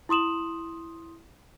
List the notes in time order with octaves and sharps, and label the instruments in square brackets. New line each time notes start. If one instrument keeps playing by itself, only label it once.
[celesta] E4 C6 D#6 E7 F#7